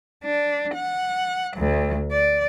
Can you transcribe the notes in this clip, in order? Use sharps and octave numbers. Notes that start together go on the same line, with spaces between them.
D4
F#5
D2
D5